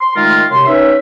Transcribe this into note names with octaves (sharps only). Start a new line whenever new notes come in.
C6
D#3 G#3 A3 F4 A#4
F#2 C3 C6
C#4 D#4 B4 E5